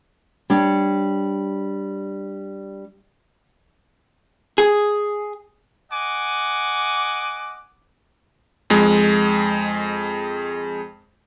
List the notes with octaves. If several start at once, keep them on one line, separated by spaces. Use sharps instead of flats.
G3 D4 C#5
G#4
D#5 F#5 G#5 D6
F2 G#3